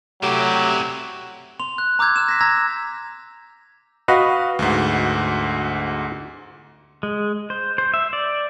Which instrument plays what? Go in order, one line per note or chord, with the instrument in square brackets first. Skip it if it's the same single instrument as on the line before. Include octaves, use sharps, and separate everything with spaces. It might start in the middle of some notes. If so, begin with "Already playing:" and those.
[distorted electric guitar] C3 E4 [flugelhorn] F#3 [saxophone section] A3 G4
[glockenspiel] C6 F7
F#6
A#5 D6 E6 G6 G#6
F6 E7
A#6 B6
A#5 E6 G#6 A#6
[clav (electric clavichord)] F#4 B4 D#5 [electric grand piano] F5
[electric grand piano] D2 G#2
[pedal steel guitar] G#3
C5
C5
E5
D5